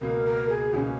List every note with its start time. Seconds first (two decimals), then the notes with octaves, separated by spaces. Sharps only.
0.01 C#2 B2 A#3 A#4
0.25 A#4
0.49 G#4
0.74 C#2 B2 A#3 C#4